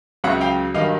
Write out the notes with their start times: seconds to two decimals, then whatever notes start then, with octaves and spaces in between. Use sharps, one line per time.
0.24 C#2 C#3 F#3 E5 F#5
0.41 F5 G5
0.74 G2 D#3 F#3 D#5 F5